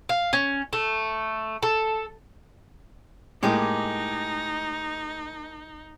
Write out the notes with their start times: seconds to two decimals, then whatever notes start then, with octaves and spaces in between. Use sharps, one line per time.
0.09 F5
0.33 C#4
0.73 A3
1.63 A4
3.43 A2 G#3 A#3 D#4 G4 G#4 D6